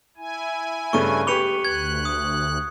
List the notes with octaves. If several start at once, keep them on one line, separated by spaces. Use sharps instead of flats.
E4 G#5
G2 C#3 A3 C#6 D#7
G4 B4 C#6 C#7 F7 G7
D2 F#6 G#6
D#6